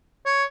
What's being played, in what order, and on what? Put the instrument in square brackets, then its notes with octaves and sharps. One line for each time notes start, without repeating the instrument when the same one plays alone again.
[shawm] C#5